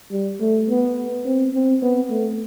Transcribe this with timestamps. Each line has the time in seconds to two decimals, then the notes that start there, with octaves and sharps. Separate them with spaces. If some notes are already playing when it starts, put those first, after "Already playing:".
0.12 G3
0.40 A3
0.69 B3
1.25 C4
1.54 C4
1.82 B3
2.10 A3